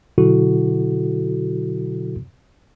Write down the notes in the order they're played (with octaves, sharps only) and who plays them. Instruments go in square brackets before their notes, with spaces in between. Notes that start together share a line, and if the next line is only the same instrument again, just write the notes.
[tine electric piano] B2 D3 F#3 E4 F#4 A4